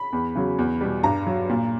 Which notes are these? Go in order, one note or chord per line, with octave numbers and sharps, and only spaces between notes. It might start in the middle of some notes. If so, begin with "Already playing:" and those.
Already playing: B5
E2
C#3 F#3
E2
B2 G3
G2 A#5
F#3
A#2